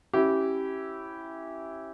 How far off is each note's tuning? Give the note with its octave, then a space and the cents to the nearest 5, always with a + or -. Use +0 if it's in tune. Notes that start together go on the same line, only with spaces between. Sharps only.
C#4 -25 E4 +0 G4 -20